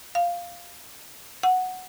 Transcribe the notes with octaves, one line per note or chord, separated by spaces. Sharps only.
F5
F#5